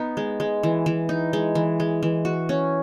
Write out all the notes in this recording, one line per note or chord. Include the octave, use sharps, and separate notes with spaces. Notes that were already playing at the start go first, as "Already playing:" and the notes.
Already playing: B3 D#4
G#3
G#3
E3
E3
D#4
G#3
E3
G#3
E3
F#4
C#4